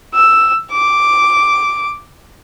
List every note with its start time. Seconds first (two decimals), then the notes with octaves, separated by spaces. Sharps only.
0.14 E6
0.72 D6